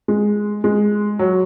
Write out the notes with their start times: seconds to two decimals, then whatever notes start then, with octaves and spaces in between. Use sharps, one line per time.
0.08 G#3
0.64 G#3
1.19 F#3